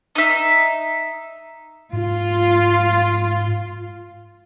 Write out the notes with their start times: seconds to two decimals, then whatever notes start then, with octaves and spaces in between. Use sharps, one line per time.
0.15 D#4 E5
1.93 G#2 F4